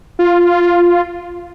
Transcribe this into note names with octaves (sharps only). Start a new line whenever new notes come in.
F4